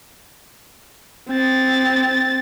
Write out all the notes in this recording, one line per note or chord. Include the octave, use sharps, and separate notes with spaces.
C4 A6